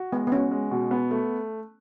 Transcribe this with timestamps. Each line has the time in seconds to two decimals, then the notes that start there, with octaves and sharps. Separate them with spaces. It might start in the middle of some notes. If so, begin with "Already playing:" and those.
Already playing: F#4
0.12 G#3 B3
0.27 B3
0.32 C#4 F#4
0.52 G#3
0.71 B2
0.91 B3
1.11 A3